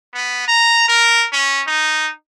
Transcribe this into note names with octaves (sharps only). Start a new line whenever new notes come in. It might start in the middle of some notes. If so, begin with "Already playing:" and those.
B3
A#5
A#4
C#4
D#4